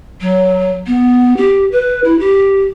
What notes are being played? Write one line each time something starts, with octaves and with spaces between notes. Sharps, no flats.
F#3
B3
G4
B4
E4
G4